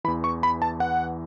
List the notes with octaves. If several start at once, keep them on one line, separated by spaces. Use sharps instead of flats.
E2 E3 B5
C#6
B5
A5
F#5